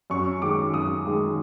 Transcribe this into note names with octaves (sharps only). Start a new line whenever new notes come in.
F#2 C#6
D#3 G#3 D6
F#2 D#6
D#3 G#3